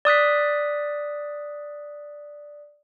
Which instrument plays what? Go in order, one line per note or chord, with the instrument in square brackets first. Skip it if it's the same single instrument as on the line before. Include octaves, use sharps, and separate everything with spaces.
[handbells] D5 D#6 F#6 B6